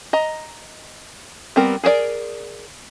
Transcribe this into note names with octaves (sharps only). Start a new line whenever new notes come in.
D#5 A#5
G3 B3 C4 A#4
G#4 A#4 C5 D5